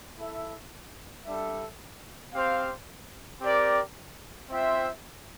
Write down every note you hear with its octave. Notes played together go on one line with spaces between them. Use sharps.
E4 A4 E5
G3 D4 A4 E5
C4 G4 C5 F5
C4 G4 A#4 D5
C4 F4 C5 E5 G5